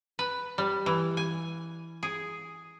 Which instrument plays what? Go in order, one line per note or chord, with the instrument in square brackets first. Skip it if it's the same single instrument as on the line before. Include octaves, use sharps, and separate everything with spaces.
[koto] B4
G3
E3
G#5
G#4